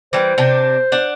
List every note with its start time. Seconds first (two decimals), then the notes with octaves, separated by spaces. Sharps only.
0.13 E3 G3 C5
0.38 C3 D4
0.92 D4 F#5